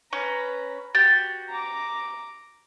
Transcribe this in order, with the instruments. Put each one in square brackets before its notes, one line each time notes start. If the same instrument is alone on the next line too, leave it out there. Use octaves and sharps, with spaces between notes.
[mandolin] C#4 [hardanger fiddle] B4 A#5
[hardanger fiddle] F#4 [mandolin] G4 [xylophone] A6
[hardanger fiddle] A#5 D6